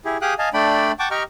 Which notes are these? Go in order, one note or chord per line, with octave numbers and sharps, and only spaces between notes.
E4 G4 G#4
G4 G#4 F5 G5 D#6 F#6
D#5 F5 G#5 A5
A3 D4 D5 G5 B5
F#5 G5 A5 C#6 D6
G4 D#5 G5 A#5 C#6 F6